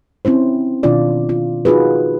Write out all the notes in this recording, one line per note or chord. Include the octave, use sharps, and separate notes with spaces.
C4 C#4 E4 C5
B2 D#3 D4 F4 D5
F4
D#4 F4 F#4 G#4 B4